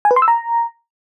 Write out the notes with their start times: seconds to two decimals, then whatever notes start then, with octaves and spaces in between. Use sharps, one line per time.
0.05 G#5
0.11 B4
0.16 C6
0.22 E6
0.28 A#5